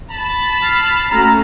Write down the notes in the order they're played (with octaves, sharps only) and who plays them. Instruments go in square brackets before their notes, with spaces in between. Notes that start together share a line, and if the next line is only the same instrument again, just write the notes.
[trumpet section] A5 B5
[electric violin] F6 C7
[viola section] A3 C#4 F#4 [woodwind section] A#5 [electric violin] F6